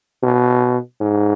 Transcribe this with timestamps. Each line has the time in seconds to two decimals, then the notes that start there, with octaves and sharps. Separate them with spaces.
0.23 B2
1.01 G#2